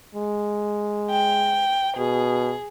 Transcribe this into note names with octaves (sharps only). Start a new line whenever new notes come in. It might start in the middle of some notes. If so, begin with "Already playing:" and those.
G#3
G5
B2 G#4